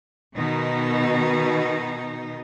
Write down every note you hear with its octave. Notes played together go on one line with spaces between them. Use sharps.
B2 D#3 D#4